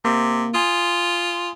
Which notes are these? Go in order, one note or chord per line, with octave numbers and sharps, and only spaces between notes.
C3 A#3
F4 G#5 C6 D#6